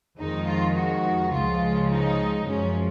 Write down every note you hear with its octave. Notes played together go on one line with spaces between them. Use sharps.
F2 D#3 G#3 D#4
F4
F#4
C#2 C#3 F3 G#3 F4
D#4
F#2 F3 G#3 C#4